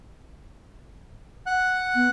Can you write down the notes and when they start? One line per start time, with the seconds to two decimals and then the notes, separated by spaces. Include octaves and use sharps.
1.46 F#5 F#6
1.95 B3